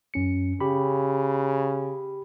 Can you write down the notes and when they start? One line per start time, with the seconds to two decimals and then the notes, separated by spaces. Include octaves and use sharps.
0.14 F#2 C#4 C#7
0.61 C#3 G4 B5